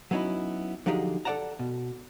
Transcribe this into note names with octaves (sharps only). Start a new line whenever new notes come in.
F#3 B3 C#4 D#4 E4
D3 F3 F#3 D#4 G4 G#4
A4 B4 D5 F#5 A5 A#5
B2